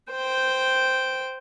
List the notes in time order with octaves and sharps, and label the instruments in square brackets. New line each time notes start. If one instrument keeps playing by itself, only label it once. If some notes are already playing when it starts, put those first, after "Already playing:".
[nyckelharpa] C5 G5